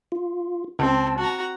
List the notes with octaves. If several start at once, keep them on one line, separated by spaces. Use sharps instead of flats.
F4
C#2 C4 A5
F#4 A#5